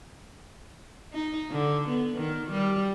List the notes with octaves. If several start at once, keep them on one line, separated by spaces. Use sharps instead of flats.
D#4
D3
B3
D#3
G3